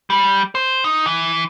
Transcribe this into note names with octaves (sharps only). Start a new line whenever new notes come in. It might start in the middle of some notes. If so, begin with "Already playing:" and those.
G3
C5
D#4
E3